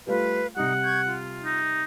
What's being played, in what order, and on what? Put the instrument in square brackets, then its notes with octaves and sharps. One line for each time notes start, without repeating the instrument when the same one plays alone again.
[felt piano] G3 A3 F4 [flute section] B4 F5
[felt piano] C3 G3 [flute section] D#4 [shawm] F#5
[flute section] C#6 G6 G#6
F4
[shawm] D#4